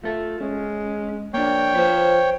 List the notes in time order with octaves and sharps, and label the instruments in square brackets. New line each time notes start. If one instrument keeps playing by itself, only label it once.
[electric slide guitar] A3 A4 [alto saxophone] F4
[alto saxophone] G#3 [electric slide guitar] C#4
[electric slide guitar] A#3 D4 [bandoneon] C#5 G5
[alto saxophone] F3 [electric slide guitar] B4 C5